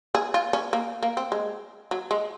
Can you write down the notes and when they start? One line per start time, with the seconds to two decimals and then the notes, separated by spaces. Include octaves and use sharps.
0.15 G#4
0.34 F4
0.53 C#4
0.73 A#3
1.03 A#3
1.17 C4
1.32 G#3
1.91 F#3
2.11 G#3